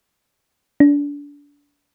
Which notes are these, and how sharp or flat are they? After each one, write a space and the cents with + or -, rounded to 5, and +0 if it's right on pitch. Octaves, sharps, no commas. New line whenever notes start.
D4 -30